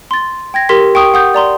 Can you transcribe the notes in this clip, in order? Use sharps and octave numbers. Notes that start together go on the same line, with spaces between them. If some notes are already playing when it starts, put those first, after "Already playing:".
C6 A6
G5 G#6 A#6
G4 A#4 C6 B6
G5 C#6 D#6
F#5 D#6 G6
D5 A#5 C6